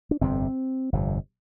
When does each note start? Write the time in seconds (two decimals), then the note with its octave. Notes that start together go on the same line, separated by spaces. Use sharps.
0.11 D4
0.21 G1 F2 C3 C4
0.93 G1 F2 C3